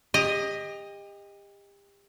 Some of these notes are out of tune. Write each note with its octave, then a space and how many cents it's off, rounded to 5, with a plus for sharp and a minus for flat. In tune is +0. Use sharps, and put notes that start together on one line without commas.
G4 +35 D#5 +0